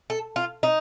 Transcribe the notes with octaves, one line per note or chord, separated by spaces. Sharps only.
A4
F4
D#4